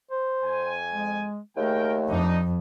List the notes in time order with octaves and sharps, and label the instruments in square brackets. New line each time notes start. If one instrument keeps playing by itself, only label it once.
[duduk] C5
[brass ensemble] F2 G#5
[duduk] G#3
[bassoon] D#2 [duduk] A3 [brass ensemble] G#4 A#4 G5
[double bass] F2 [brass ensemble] D4 D#4